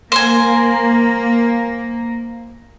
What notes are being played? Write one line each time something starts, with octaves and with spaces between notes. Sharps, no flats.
A#3 C5 G#5